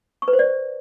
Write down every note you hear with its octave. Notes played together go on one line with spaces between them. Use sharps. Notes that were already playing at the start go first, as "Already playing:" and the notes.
C#6
B4
C5
D5